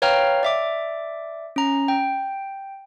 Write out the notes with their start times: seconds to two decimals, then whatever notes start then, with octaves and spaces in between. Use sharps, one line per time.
0.02 B4 C#5 F5 G5 A#5 F6
0.43 D5 E5 D6
1.56 C#4 A#5
1.88 G5